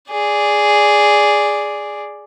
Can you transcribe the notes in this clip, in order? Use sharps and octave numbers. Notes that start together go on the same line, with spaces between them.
G#4 D5